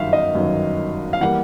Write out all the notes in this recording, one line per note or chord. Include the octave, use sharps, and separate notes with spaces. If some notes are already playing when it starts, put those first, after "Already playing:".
Already playing: G1 F#2 D#3 E5 F5
D#5
G1 F#2 D#3
F5
E3 G3 A#3 F#5